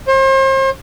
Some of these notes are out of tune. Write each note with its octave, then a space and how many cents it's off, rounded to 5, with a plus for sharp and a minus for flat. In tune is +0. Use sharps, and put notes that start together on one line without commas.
C5 +40